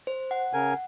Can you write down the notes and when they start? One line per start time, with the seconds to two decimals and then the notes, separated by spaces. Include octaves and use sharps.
0.07 C5
0.31 F#5
0.54 C#3 A#4 G#5